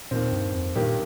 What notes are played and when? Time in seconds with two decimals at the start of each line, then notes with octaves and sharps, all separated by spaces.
0.11 D#2 A#2 D#3 C4
0.33 G2
0.54 F2
0.75 G2 A#2 D#3 A#3 G4